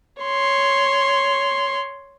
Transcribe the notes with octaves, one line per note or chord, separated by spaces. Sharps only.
C#5 C6